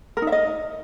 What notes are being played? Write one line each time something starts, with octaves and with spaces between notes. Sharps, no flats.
A#4
D#4
E5
D#5